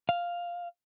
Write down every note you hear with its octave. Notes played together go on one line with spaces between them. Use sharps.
F5